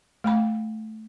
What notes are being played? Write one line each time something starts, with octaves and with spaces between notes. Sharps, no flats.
A3 G5 B5